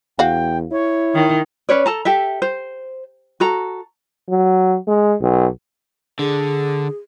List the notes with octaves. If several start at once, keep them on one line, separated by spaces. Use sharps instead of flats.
E2 F#4 F5 G5
E4 C#5
D#3
C#4 B4 C#5 D5
A4 A5 A#5
G4 A4 E5
C5
F#4 A4 A#5
F#3
G#3
B1
D3 G#4